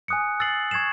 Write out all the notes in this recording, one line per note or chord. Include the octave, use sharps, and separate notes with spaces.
G#5 D#6 F#6 C#7
E6 A6 C7 F#7
C#6 G#6 C7 E7